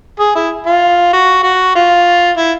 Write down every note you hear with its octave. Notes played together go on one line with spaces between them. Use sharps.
G#4
E4
F4
F#4
F#4
F4
E4